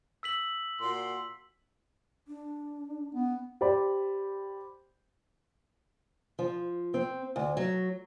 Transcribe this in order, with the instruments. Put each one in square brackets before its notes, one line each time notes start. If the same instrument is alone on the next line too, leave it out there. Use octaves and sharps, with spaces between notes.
[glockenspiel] E6 B6 F#7
[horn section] A#2 F#4 C6
[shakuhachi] D4
[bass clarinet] B3
[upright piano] G4 C5 D5 B5
[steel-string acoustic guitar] F3
C4
D2
F#3